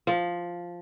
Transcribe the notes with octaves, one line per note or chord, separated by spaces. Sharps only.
F3